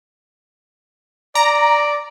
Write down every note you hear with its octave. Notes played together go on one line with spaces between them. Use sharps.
D5 A#5